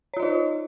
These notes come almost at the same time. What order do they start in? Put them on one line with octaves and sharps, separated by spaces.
C#5 F4 D#5 D#4